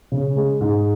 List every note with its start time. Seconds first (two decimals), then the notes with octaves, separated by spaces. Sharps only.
0.12 C#3
0.36 G#3
0.61 G#2